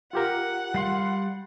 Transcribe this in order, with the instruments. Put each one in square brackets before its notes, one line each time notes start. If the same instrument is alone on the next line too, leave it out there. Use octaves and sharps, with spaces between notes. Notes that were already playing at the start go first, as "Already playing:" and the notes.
[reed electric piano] F4 G4 A#4 [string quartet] F#5
[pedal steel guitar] G3 F5 C6